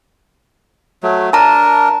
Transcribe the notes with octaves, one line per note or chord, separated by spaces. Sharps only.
F#3 A3
D4 A#4 A5 A#5